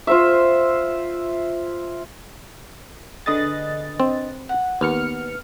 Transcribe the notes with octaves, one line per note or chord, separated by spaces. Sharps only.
F4 C5 E5
D3 G#4 B4 D#5 D#6 A6
C4
F#5
D#2 B3 F6 C#7